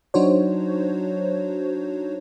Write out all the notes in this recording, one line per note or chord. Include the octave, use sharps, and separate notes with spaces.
F#3 D4 D#4 F#4 C5 C#5